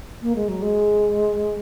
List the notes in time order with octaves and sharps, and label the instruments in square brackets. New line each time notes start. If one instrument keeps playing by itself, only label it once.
[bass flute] A#3
G#3
F#3
G#3